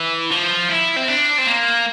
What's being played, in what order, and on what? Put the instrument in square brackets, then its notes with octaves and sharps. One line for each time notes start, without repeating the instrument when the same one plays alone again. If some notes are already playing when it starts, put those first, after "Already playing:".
Already playing: [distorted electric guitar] E3
F3
E4
C4
D4
C4
A#3